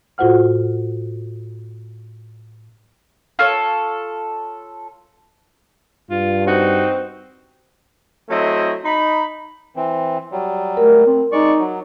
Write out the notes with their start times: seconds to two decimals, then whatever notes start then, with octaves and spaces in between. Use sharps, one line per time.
0.18 A2 F4 F#4 C5 F#5 F6
3.39 F4 A4 C#5
6.11 G2 F4
6.47 C4 D#4 F#4
8.30 F#3 A3 C4 E4 D#5
8.84 D#4 B5
9.76 E3 C4
10.32 F#3 G3
10.77 A3 A#4
11.06 C4
11.32 G#3 D#4 D5 C#6
11.59 F#3